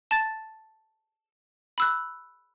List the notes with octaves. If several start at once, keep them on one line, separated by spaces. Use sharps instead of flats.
A5 A6
B5 E6 F#6